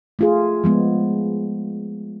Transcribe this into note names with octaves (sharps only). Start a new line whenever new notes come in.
A3 F4 G#4
F3 G#3 B3